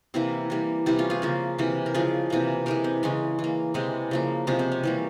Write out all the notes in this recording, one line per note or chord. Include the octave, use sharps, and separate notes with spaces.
C3 E3 A#3 C4 E4
E3 G3 A#3
C3 E3 G3 E4 G4
C#4 F4
F4 G#4
C#3 F3 A#3
C3 E3 A#3
A#4
C#3 F3 G#3 F4 G#4
C3 E3 A#3
C3 E3 G#3 G4 A#4
C4
C#3 E3 G#3 C#4
E3
A#3
C3 E3 G#3 C4 E4
C#3 F3 A#3
C3 F3 G#3 C#4
C4
C#4
E3 G3 A#3